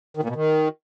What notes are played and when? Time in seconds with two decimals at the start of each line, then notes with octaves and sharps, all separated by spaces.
0.17 D#3
0.23 A#2
0.30 B2
0.36 D#3